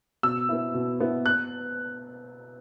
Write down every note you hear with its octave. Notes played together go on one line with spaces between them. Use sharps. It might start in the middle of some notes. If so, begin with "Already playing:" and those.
B2 E6
B3 E4
B2
B3 E4
F#6